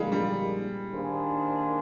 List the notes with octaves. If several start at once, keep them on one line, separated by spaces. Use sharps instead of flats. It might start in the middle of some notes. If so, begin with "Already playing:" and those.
Already playing: D3 F3 G3 G#3 A#3 D#4
G3
D#3 A#3 D4 G#4 C5